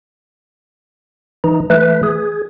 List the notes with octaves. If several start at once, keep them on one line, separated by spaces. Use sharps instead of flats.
E3 D#4
E3 A3 B4
G#4